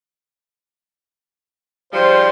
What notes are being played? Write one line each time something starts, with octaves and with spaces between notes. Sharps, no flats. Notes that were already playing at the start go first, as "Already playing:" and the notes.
G#2 F3 G3 C5